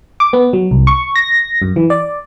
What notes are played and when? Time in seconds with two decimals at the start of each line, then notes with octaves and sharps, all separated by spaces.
0.20 D6
0.33 B3
0.53 F#3
0.71 C2
0.87 C#6
1.16 A#6
1.62 F#2
1.76 E3
1.90 D5